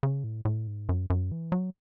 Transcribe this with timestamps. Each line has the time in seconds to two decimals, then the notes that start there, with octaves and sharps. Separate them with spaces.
0.03 C#3
0.24 A2
0.45 A2
0.67 G#2
0.89 F#2
1.10 F#2
1.32 E3
1.52 F#3